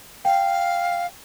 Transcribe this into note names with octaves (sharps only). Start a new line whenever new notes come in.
F5 G5